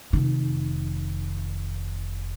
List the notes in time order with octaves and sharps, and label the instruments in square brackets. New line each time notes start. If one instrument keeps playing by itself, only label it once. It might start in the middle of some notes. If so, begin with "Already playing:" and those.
[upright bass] F1 D#3